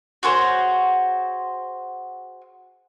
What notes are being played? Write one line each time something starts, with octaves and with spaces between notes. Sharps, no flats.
F#4 G#4 C5 C#5